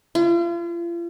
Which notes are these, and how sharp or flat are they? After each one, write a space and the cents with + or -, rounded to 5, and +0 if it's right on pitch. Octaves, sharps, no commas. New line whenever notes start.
F4 -40